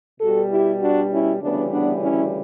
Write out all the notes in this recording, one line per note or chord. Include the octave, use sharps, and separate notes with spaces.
B2 G3 F#4 A4
E4 G4
D4 F#4
C#4 E4
D2 C#3 E3 G3 B3 D4
B3 D4
C#4 E4